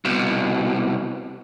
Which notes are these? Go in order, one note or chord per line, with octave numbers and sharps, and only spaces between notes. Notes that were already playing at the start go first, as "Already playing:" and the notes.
C2 B2